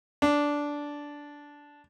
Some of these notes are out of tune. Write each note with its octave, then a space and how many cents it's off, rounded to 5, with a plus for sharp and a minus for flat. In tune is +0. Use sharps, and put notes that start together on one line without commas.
D4 -10